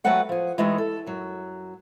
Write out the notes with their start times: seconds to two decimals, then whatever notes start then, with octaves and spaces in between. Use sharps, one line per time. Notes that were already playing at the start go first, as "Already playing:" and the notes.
0.04 F#3 A3 F#4 B4 F#5 G5
0.29 F3 G#4
0.58 E3 G#3 A3 D#4 G4
0.78 A4
1.06 F#2 F#3